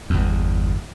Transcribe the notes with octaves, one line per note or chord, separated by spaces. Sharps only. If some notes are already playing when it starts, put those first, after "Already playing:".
G1 E2